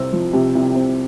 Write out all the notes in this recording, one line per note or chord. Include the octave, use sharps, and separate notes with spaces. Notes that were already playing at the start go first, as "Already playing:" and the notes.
Already playing: C2 C4 E6
F3
C3
C2
C4